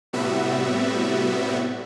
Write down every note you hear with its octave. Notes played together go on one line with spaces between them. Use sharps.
A2 C3 G3 B3 F#4 E5